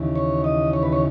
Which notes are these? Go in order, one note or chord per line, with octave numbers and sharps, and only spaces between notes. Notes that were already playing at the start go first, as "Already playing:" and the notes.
Already playing: D#2 C#3 E3
C#5
D#5
C#5
B4
C#5